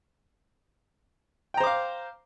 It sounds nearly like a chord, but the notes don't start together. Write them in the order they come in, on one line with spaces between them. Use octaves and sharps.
G5 A#5 C5 D6 F5